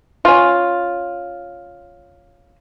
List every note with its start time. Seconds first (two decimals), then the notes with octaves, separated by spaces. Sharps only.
0.25 C#4 F4